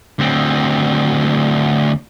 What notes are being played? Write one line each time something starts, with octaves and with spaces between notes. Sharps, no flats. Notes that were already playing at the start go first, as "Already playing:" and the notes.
D2 C4